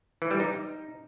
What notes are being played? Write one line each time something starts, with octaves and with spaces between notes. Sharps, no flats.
E3
G3
D#4